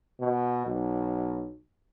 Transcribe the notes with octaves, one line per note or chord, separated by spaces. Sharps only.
B2
B1